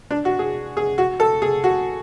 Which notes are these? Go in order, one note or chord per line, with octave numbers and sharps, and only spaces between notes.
D4
F#4
G#4
G#4
F#4
A4
G#4
F#4